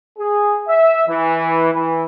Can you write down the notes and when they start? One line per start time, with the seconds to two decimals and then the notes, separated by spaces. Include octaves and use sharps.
0.19 G#4
0.68 E5
1.08 E3
1.73 E3